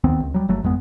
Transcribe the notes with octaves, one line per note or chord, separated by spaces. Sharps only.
D#2 D#3 B3 C4
C#2
F#3 G3
G1 F#3 A3
G#1 F2 G#3 B3